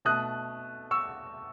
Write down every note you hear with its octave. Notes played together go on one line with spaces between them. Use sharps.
B2 A3 D#6 F#6
C#6 E6